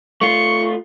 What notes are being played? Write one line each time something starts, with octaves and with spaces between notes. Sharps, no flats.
A3 F4 C#6